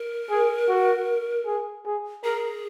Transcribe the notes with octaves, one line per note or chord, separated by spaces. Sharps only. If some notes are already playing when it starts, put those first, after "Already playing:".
Already playing: A#4
G#4
F#4
G#4
G#4
G#4 A#4